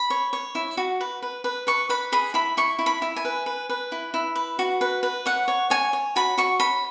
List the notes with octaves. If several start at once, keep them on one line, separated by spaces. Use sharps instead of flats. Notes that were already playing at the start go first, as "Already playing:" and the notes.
Already playing: B5
C#5
C#5
E4
F#4
B4
B4
B4
B4 C#6
B4 B5
G#4 B5
E4 B5
E4 C#6
E4
B5
E4
G#5
B4
B4
B4
E4
E4
B4
F#4
B4
B4
C#5 F#5
C#5
C#5 G#5
C#5
F#4 B5
F#4 C#6
C#5 B5